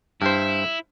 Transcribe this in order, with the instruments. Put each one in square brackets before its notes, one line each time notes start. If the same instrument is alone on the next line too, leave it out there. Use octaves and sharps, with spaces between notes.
[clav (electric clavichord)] G2 C5 [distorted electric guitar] E4